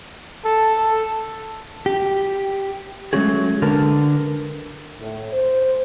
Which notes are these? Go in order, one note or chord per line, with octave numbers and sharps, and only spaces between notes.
A4
A4
G4
F#3 G#3 A3 C#4 F#4 G#4
D3 A#4 B4 A5
A2
C5